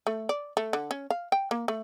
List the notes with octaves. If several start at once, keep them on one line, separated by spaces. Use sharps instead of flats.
A3
D5
A3
D3
C#4
F5
G5
A#3
A3